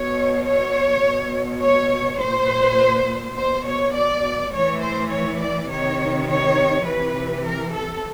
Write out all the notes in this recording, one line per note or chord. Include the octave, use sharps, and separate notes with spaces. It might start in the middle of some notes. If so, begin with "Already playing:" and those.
Already playing: B2 C#5
C#5
B2
C#5
A#2 C5
B2 C5
C#5
D5
A2 E3 C#5
C5
C#5
D5
C3 D#3 C#5
C#5
C3 E3 B4
A#4
A4